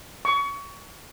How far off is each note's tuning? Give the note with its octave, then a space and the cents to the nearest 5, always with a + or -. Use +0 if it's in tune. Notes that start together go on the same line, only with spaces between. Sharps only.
C#6 +25